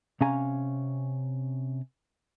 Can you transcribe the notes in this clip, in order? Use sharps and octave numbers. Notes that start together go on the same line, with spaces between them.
C3 C#4 F5 G#5 A#5